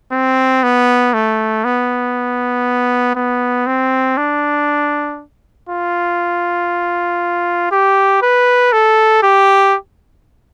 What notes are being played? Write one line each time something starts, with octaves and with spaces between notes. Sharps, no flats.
C4
B3
A3
B3
B3
C4
D4
F4
G4
B4
A4
G4